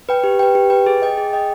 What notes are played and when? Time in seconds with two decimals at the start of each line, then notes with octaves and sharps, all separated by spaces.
0.09 B4 G5
0.24 G4
0.39 B4 G5
0.55 G4
0.70 B4 G5
0.86 G#4
1.02 D#5 G5
1.18 G#4
1.33 D#5 G5